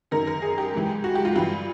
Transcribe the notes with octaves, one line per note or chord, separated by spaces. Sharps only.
F#2 D#3 A#4
A#4
G#4
G4
G#2 E3
F#4
G4
F4
G2 E3 F4